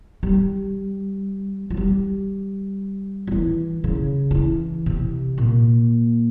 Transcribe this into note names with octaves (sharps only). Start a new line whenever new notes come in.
G3
F3
G3
F3
E3
C#3
F3
E3
C3
A#2